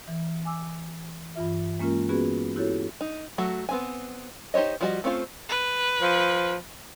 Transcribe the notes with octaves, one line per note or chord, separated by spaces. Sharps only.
E3
G#5 D6 E6
G2 E3 F4 E5
G#3 A#3 C#4 F4 A#4
B3 C#4 F#4 G#4 B4
E4 F#4 G4 A4 C#5
D#4
F#3 A3 F#4
B3 C4 G#5
D#4 G4 C5 C#5 D#5
F3 G3 F#4 G#4 D#5
A3 C4 C#4 F4 C5
B4
F3